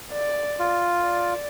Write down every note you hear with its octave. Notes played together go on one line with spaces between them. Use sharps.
D5
F4
D5